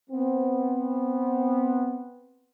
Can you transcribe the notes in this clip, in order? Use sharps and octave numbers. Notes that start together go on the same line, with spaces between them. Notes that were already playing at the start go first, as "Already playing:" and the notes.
B3 C4